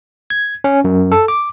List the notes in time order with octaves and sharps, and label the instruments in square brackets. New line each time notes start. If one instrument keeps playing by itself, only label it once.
[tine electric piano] G#6
C#4
F#2
A4
D6